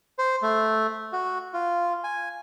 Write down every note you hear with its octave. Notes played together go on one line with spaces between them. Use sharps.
C5
A3
F#4
F4
G#5